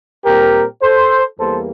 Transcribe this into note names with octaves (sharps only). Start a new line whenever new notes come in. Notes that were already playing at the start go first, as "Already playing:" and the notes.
A#2 G3 C4 G4 A#4
A4 C5
E2 E3 G3 A#3 A4 C5